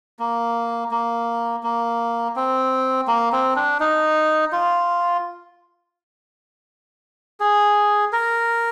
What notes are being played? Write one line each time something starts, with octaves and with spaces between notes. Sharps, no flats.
A#3
A#3
A#3
C4
A#3
C4
D4
D#4
F4
G#4
A#4